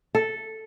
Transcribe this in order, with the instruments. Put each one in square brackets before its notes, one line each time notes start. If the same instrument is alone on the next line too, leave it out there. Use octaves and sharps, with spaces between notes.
[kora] A4